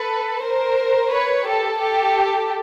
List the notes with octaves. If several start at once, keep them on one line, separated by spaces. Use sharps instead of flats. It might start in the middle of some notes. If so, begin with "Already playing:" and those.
Already playing: A4 B4
A#4 C5
B4 C#5
G4 A4
G4 A4